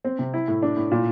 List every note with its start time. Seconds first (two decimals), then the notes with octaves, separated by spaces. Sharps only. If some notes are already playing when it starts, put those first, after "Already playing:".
0.05 C4
0.19 C3
0.34 E4
0.48 A2
0.62 D4
0.77 A2
0.91 A#2